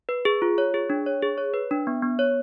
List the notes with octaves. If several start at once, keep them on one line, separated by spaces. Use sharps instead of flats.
B4
G#4
F4
C#5
G#4
D4
C#5
G#4
C#5
B4
D4
B3
B3
C#5